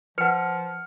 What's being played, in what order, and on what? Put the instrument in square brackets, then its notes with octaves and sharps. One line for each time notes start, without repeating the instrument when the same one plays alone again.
[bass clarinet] F3 [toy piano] B4 F#5 [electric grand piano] F6 C#7